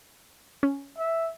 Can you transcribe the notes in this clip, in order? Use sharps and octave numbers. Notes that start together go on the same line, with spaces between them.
C#4
E5